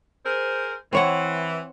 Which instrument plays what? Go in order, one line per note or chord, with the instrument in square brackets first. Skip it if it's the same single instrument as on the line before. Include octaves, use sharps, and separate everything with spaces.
[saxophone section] G#4 A#4 C5
[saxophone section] E3 [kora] C4 C#5 F#5